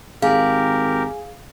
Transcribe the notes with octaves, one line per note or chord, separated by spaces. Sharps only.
G#1 G4 G#4 A#4 F5